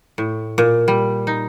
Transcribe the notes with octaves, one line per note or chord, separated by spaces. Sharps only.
A2
A#2
G3
D#4